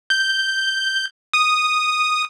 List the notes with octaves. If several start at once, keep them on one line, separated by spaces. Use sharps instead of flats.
G6
D#6